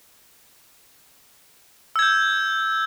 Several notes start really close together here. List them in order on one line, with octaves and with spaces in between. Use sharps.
E6 G#6 G6